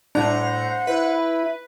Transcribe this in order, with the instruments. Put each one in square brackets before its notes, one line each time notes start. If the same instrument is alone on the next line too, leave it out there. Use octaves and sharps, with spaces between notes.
[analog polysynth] A2 A#5 [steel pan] D4 [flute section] C5 F#5
[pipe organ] E4 [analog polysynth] B4